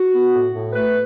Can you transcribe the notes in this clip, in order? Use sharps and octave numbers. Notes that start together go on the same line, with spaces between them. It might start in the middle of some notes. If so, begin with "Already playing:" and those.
Already playing: F#4
B3
A2
A2
A3 B4